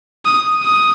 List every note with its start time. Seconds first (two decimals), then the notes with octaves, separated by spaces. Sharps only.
0.25 D#6
0.63 D#6